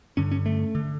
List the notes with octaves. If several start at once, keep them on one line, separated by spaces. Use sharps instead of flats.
G2 D3 C#4
C#4
A3
D3